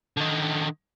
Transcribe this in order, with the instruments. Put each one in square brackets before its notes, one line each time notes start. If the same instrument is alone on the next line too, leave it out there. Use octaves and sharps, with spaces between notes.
[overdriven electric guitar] D3 D#3